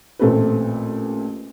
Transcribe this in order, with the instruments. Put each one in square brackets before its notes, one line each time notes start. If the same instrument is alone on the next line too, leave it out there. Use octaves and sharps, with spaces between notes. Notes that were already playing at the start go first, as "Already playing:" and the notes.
[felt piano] A1 A#2 A3 C4 B4